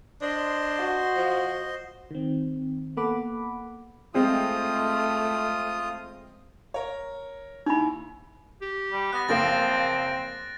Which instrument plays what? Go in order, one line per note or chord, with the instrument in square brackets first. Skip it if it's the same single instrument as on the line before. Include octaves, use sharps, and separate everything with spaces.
[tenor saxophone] D4 [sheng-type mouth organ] C5 D#5 C6
[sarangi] F#4
[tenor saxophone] F3
[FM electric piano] D#3 C4
A#3 B3 A4 F#5 B5 D6
[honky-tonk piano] G#3 C4 G#4 [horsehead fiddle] A3 [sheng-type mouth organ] F4 D#6
[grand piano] A#4 C#5
[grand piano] D#2 E4 [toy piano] D#4 B5
[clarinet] G4
[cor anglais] G3
[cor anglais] B3 [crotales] F#6 A#6
[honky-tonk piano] F#1 A#3 F5 [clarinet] F3 [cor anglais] C4 [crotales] A6 A#6 D7